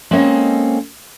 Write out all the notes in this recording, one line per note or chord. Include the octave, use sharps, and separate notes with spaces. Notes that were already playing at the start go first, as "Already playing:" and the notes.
G#3 A#3 C4 C#4 A4 D#5